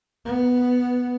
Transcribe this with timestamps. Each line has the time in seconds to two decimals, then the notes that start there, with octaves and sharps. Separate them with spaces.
0.25 B3